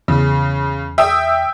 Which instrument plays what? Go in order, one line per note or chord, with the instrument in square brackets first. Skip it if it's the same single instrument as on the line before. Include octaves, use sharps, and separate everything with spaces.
[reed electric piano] E2 [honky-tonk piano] C#3
[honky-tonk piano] E5 G5 D#6